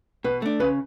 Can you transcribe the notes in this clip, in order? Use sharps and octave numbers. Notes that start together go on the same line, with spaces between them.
B2 B4
A3 D4
C#3 B4